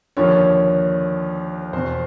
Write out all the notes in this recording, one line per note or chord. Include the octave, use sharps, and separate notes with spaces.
D#2 D3 F3 C#5
E2 B2 C5